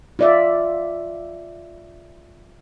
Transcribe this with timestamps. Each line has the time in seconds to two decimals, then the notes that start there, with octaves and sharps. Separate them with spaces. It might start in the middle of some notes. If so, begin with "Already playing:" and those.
0.19 F4 D5 E5